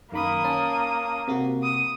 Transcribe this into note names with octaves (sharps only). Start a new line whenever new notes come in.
F#2 D#3 A#3 B5 D#6
C#4 A5
C3 A#3 F#4
D#6